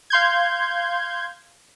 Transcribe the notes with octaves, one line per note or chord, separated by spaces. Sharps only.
F5 C6 G6 G#6